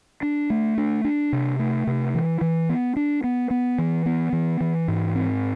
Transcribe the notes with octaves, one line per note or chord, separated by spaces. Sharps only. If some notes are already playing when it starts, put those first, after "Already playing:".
D4
A3
D4
D4
C3
A3
C3
E3
E3
B3
D4
B3
B3
E3
B3
E3
E3
G#2
C4